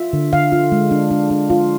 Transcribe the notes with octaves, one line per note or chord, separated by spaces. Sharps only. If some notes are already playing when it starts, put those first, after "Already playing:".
Already playing: F4 E5
D3
D3 F5
F4
G#3
D4
D4
D4
F4